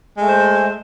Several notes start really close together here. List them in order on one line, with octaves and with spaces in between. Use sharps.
G#3 A3 C5